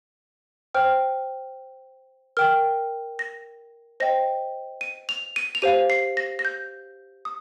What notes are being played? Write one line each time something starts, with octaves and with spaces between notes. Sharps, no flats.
C5 G5 F6
A#4 G5 F6
A#6
C5 D#5 G5 A#6
D#7
F7
D#7
F7
G4 C5 F5 D#7
C7
A#6
A#6
G6
D#6